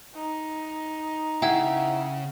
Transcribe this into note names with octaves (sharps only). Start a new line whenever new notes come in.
D#4
C#3 E4 F#5 G5